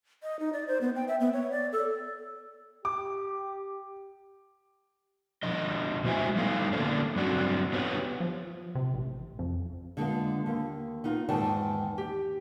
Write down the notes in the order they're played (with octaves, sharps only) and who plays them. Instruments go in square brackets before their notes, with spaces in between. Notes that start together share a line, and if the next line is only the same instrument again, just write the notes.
[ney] D#5
D#4
D5
C5
B3
G5
E5
B3
C#5
D5
A4
[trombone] G4 [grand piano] D6
[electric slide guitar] B2 F3 D4 D#5
A2 G#3 F#4 C5 E5 G#5
F3 G3 A3 B3 D#4 F5
D3 A#3 C#4 D4
G2 F#3 C4 D4 F#4
B3 D4 G4 B4 C#5 F#5
[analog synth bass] F3
C3
A1
F2
[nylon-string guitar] D3 G#3 B3 F4
D#2
B3 D#4 F4
E2 G#2 D#3 G5 A5
G4